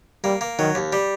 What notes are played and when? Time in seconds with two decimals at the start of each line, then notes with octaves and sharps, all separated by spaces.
0.24 G3 A#3
0.41 A#3
0.59 D#3 F#3
0.75 D#2
0.93 G3